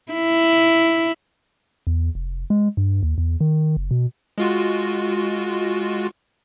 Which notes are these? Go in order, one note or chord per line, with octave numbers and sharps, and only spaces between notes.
E4
E2
F1
G#3
G2
D#2
E2
D#3
F#1
B2
G#3 F4 F#4